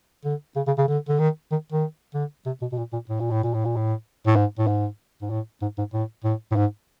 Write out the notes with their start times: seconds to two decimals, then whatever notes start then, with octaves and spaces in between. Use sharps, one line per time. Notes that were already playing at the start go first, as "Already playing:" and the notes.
0.25 D3
0.56 C#3
0.67 C#3
0.78 C#3
0.88 D3
1.09 D3
1.19 D#3
1.52 D#3
1.72 D#3
2.15 D3
2.46 C3
2.62 B2
2.72 B2
2.78 A#2
2.93 A#2
3.09 A2
3.20 A#2
3.31 A2
3.43 A#2
3.54 A2
3.65 A#2
3.76 A2
4.26 A2
4.36 G#2
4.59 A2
4.67 G#2
5.22 G#2
5.30 A2
5.62 G#2
5.78 G#2
5.94 A2
6.24 A2
6.52 A2
6.56 G#2